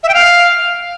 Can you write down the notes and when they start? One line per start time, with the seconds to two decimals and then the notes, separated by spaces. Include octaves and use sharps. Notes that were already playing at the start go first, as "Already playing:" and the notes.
0.03 E5
0.09 G5
0.14 F5